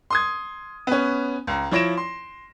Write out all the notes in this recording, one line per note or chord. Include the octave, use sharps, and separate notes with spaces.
C6 D#6 G#6
B3 C#4
C#2 A#5
F3 E4 C#5 A#6 D7 E7
C6